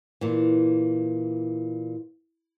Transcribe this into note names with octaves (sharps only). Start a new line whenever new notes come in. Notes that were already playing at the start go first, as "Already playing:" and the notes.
A#2 E3